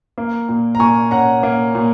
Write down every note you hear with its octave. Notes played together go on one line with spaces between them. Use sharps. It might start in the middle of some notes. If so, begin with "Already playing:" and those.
A#3
A#2
A#5
A#2 G#5 C#6
C#4 F#5 A#5
A#3
A#2